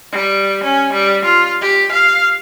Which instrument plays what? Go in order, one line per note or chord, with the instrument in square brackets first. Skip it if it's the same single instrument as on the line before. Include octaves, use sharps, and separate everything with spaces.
[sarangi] G3
C#4
G3
F4
G4
F5